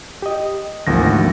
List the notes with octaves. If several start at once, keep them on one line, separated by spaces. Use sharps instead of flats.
G4 D#5
G#1 D2 E3 F3 A#3 A#6